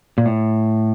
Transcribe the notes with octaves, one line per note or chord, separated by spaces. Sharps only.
A#2
A2